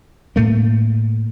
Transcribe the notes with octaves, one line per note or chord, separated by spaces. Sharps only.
A2 A3 A#3